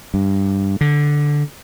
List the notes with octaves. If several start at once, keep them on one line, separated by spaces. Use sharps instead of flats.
G2
D3